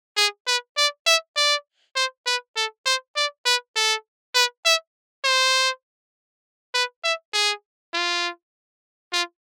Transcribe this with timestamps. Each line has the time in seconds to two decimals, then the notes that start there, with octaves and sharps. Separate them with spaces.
0.17 G#4
0.47 B4
0.77 D5
1.07 E5
1.37 D5
1.96 C5
2.26 B4
2.56 A4
2.86 C5
3.16 D5
3.46 B4
3.76 A4
4.35 B4
4.65 E5
5.24 C5
6.74 B4
7.04 E5
7.34 G#4
7.94 F4
9.13 F4